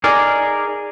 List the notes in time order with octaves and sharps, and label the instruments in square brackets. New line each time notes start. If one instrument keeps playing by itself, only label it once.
[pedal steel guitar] D#4 G#4 A#4 D5